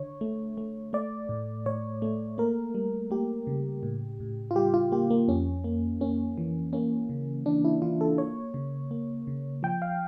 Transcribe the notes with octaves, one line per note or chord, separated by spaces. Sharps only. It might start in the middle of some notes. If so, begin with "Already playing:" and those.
Already playing: D3 C#5
A3
A3
A3 D5
A2
A2 C#5
A3
A#3 A#4
G3
A#3 G4
C#3
A2
A2
F4
G3 G4
F4
A#3 G4
A#3
F2 C#4
A#3
A#3 C#4
E3
A#3 C#4
C#3
E3 D4
E4
E3 F4
A4
A#3 C#5
C#3
A#3
C#3
F3 G5
F5